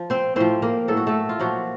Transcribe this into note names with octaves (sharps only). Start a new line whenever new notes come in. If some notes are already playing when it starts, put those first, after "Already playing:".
Already playing: F3
C4 C5
A2 F3 C4 C5
A#3 A#4
A2 F#3 A4
F#4
A3 A4
F4
A#2 F3 F#3 F#4